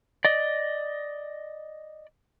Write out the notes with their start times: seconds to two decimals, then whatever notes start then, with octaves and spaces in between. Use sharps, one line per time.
0.25 D5 D#5